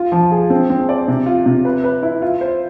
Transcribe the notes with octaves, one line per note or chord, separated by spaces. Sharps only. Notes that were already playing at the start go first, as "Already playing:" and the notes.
Already playing: F4
F3
G#4
C4
C4
D5
C3
F4
C3
B4
B4
E4
F4
C5